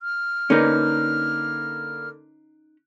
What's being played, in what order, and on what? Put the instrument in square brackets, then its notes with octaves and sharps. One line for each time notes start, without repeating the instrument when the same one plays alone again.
[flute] F6
[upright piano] D3 A#3 B4 [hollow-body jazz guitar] C#4 D#4